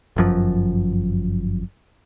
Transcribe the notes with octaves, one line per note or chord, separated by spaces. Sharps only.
G1 F#2 F3